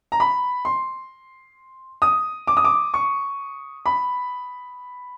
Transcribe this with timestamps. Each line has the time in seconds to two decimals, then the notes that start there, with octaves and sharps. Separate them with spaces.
0.12 A#5
0.20 B5
0.65 C6
2.02 D#6
2.47 D6
2.57 D#6
2.64 D6
2.94 C#6
3.86 B5